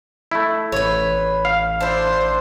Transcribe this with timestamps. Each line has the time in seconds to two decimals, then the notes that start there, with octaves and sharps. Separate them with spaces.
0.31 A3 E4
0.72 A1 B4 C#5
1.45 F5
1.81 D4 E4 C5